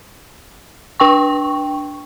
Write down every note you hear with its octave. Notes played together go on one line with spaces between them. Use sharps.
D4 G5 C#6